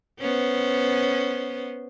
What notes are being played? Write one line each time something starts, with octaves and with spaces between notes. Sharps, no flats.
B3 C#4 C5